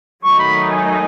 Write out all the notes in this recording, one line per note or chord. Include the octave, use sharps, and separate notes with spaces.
D#3 F#3 A3 D#4 C#6
B5
G#5